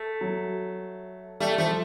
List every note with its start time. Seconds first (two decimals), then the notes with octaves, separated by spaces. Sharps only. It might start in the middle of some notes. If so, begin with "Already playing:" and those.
Already playing: A3
0.21 F#3
1.40 G3 A3
1.58 F3 A3